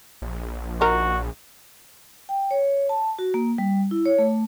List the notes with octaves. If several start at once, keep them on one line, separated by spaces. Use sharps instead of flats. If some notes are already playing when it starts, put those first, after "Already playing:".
A#1
D#4 F#4 A#4
G5
C#5
A5
F#4
A#3
G3
E4
C#5
A3